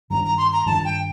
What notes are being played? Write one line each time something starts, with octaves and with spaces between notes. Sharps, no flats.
G2 D#3 G3 D4 A#5
A#5
C6
A#5
G2 D#3 G3 D4 A5
G5